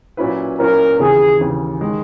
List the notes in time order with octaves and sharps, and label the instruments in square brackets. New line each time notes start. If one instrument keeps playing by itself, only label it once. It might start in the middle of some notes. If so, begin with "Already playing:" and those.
[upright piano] A#2 F#3 C#4 E4 B4
[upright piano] A#2 F#3 C#4 E4 B4 [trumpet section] A#4
[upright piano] D#2 C#3 E3 [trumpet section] G#4
[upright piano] D#2 C#3 E3
D#3 G#3